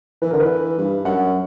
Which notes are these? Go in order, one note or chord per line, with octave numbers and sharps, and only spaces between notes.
E3 B4
D3 A#4
E3 B4
G2
F#2 F#5